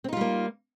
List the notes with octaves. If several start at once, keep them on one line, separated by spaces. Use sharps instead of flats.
G3 A#3 C4 D#4 F4